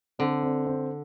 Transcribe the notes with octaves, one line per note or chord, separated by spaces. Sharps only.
D3 C4
C4
C4